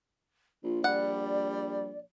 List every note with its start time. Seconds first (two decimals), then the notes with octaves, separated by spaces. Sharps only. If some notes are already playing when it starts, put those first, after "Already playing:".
0.64 A#1 F4
0.84 G3 D5 F#5